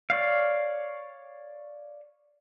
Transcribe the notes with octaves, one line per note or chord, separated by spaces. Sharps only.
C#5 D5 F5